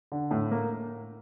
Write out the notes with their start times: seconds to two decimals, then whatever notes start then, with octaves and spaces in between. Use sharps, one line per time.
0.12 D3
0.31 A2
0.51 A#3